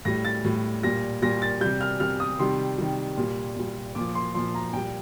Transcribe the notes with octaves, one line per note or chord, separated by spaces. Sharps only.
A2 G3 A#6
A6
A2 G3
A#2 G3 A#6
A#2 G3 A#6
A6
C3 G3 G6
F6
C3 G3 F6
D#6
C3 D#3 G3 C6
C3 D#3 G3
A#2 G3
A#2 G3
A#2 F3 D6
C6
A#2 F3 C6
A#5
A#2 G3 G5